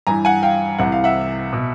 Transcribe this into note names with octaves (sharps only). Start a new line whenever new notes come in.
G2 E3 G#5 A#5
F#5 G#5
F5 G5
C2 C3 E3 F#5
F5
E5 F#5
B2